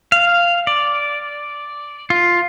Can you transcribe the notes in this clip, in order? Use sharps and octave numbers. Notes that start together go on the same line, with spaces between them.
F5
D5
F4